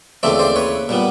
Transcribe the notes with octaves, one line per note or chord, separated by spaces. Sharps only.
D#2 C#3 E3 A3 C4 D5 E5
C5 D5
B4 C#5
A#2 G3 B3